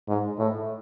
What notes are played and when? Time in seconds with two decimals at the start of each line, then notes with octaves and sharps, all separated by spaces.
0.08 G#2
0.39 A2